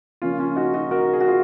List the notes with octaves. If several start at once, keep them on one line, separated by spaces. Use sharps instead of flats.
C#3 F3 A#3 C#4 F4
C#4 F4
D#4 F#4
D#4 F#4
F#4 A#4
G#4
F#4
F4 G#4